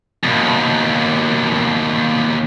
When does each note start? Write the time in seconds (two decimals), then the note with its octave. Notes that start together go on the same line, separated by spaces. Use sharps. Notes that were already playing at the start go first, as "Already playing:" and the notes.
0.24 D#2 B2